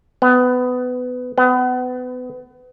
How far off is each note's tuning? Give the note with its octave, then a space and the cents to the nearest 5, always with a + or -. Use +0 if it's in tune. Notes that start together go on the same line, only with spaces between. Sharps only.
B3 +20
B3 +30